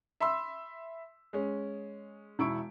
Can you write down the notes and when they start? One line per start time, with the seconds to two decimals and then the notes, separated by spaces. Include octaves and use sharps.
0.20 E5 B5 C6 E6
1.33 G#3 C#4
2.39 E1 E4 C#6 D7